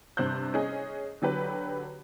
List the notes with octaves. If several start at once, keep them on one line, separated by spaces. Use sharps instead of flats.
G2 C3 C5 F#6 G6
C#4 G#4 D#5
D3 F#3 G4 B4